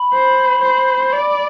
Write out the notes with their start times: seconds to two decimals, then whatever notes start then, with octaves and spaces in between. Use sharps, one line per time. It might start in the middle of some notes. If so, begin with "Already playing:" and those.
Already playing: B5
0.13 C5
0.63 C5
1.13 D5